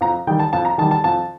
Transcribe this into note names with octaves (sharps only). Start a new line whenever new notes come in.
F2 A#5
D#3 G3 G5
A5
F2 A5
A#5
D#3 G3 A5
A5
F2 A5